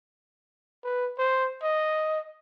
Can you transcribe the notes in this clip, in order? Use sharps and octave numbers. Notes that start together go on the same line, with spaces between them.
B4
C5
D#5